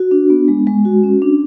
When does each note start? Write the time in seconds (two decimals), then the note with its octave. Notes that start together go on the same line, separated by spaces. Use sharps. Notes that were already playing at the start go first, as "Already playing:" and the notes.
Already playing: F#4
0.11 D4
0.30 B3
0.48 G#3
0.67 G#3
0.85 F#4
1.03 C#4
1.22 D4